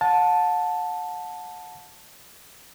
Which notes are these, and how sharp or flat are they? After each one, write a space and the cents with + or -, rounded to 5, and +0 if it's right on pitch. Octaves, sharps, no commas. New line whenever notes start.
F#5 -45 A5 +0